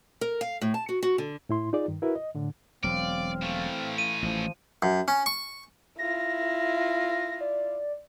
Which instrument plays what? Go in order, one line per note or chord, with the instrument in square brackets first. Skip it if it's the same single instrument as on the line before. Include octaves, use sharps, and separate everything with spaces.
[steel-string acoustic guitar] A#4
F5
A2
A5
F#4
F#4
D3
[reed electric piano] A2 E4 C6
D#4 F4 G#4 D5
G2 D#3
E4 F#4 A#4 B4 E5
D#5
A2 D3
[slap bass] E1 F#3 [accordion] C4 F5 [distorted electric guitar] D5
[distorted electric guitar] E3 A3
[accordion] F4 [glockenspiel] D#7
[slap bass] A1 [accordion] F3
[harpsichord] F#2
C#4
C#6
[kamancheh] E4 F4 [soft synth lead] A#6
[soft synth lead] D5